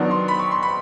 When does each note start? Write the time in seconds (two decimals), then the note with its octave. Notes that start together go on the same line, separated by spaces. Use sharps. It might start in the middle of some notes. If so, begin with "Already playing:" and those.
Already playing: D#3 F#3 B3 D4
0.11 C6
0.28 B5
0.39 C#6
0.51 C6
0.63 B5